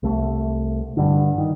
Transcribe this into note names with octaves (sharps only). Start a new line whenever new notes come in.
C2 A3
G2 D3
D#3